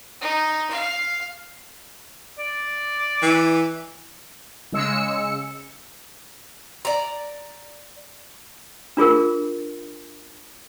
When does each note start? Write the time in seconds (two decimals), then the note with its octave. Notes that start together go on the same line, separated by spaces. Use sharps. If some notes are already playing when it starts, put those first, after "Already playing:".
0.21 D#4
0.71 F5
2.39 D5
3.22 E3
4.72 C#3 G#3 E6 C#7
6.85 D5 A#5
8.97 D4 F4 G#4 A#4